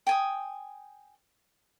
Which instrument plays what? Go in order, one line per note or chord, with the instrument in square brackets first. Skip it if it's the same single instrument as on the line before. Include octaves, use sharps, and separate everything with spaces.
[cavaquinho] G5 G#5 D#6